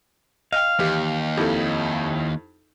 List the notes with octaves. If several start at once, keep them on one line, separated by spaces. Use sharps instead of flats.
D#5 F5 G5
D#2 E3 G4
F2 D#4 E4 G4 A4